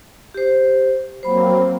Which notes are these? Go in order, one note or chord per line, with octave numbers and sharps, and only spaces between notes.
G4 C5
F#3 A#3 C4 C5 B5